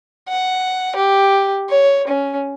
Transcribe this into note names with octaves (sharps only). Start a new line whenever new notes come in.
F#5
G4
C#5
C#4